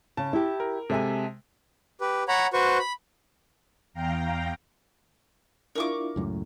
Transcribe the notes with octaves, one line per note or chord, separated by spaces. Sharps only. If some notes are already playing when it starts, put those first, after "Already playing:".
C#3 A5
E4 G4
A#4
C3 G#3 A4 E5 G#5
G4 B4
C#5 F#5 A#5 B5
F#4 B4 C5 C#6
B5
E2 F5 G5 A#5
D4 E4 F4 A#4 C#6 D6
C#2 F#2 A2